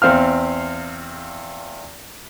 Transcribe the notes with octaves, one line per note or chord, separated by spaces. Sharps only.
E2 C4 F5 F6